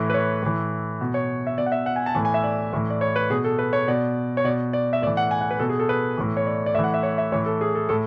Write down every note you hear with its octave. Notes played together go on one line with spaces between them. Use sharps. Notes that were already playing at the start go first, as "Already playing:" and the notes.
Already playing: A2 E3
B4
C#5
A2 E3
B2
C#5
E5
B2 D5
F#5
E5
F#5
G#5
A5
A2 E3 G#5
G#5
E5
D5
A2 E3
D5
C#5
B4
B2 G#4
A4
B4
C#5
B2 D5
C#5
B2 D5
D5
E5
A2 E3 D5
F#5
G#5
F#5
B4
B2 A4
G#4
A4
B4
A2 E3
C#5
D5
D5
A2 E3 E5 F#5
E5
C#5
E5
A2 E3 C#5
A4
G#4
A4
A2 A4